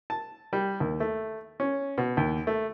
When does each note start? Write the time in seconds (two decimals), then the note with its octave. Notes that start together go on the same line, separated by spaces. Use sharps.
0.10 A5
0.53 G3
0.80 D#2
1.00 A3
1.60 C#4
1.98 B2
2.17 D#2
2.47 A3